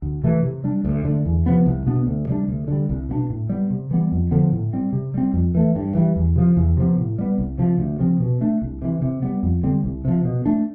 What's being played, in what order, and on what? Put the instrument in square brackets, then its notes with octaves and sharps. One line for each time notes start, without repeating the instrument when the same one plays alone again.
[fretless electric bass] D2
C3 E3 A3
C3
G3 D4
D2
D3 A3
E2
C3 F3 B3
C2
B2 B3 D4
D2
C3 G3 D4
D2
D3 G3
C2
B2 B3 D4
A2
G3 B3
C3
E3 G3 B3
F2
D3 F3 B3
A2
G3 C4
C3
G3 C4
F2
E3 A3
G2
E3 G3
E2
C3 F3
E2
C3 F3 B3
A2
G3 B3
C2
C3 F3
D2
C3 F3 C4
B2
A3 D4
C2
C3 E3
C3
G3 B3
F2
D3 G3 C4
C2
C3 F3
B2
A3 D4